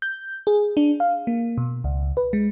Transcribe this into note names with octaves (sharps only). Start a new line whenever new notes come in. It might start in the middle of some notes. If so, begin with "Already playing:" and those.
G6
G#4
D4
F5
A#3
B2
C#2
B4
G#3